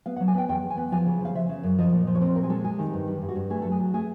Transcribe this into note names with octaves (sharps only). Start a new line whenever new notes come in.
B3 F5
F#5
F#3
G#5
B3 G5
E2 G5
E2
G#5
B3
F3 G#5
C#3
F3 F5
F3 E5
C#3
F#2
F3 D#5
A#2
F3
C#5
C4 C5
A#2 A#4
G#4
G#3 A4
G3 G#4
D#3
G2
G3
G2
F#4
G2
A3 G#4
F#3 A4
G#4
F#3
A3 G#4